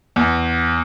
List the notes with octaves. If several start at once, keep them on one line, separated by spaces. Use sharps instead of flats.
E2